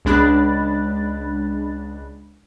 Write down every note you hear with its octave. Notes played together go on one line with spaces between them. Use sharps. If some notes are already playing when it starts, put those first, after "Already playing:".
C#2 G#3 D4 B5 F#6 A6